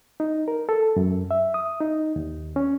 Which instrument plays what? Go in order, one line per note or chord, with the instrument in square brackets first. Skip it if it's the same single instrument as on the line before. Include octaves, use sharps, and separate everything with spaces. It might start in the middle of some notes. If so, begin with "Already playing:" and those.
[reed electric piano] D#4
A#4
A4
F#2
E5
D#6
D#4
D#2
C#4